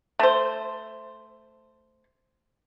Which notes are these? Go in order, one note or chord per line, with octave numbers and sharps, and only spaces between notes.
A3 C5